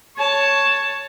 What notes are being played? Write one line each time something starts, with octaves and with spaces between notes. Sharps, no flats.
C#5 A5